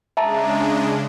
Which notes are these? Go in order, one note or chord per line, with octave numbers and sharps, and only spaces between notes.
C#3 G#3 D4 E5 A5 A#5